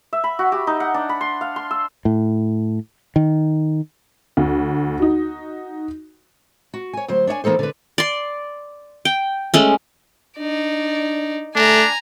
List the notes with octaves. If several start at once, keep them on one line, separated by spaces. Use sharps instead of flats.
E5
B5
F#4
G4
D#4
F#5
D4
B5
C6
F5
C6
E6
A2
D#3
D2
D#4 F#4
F#4
C#5 G#5
D2 F#3 C5
D4 C#5 D#5 G#5
E3 A#3 D#4 A4 C5
D3 B4
D5 C6
G5
G#3 A3 C#4
D4 D#4 D5
A3 D4 G#5 A#5